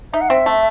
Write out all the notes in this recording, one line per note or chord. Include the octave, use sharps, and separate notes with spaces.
D#4 E5
F#5
C4 E5
A3